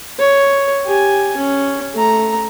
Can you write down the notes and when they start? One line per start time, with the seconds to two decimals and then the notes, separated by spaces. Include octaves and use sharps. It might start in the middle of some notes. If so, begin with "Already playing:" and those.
0.19 C#5
0.84 G4 G#5
1.37 C#4
1.94 A3 A#5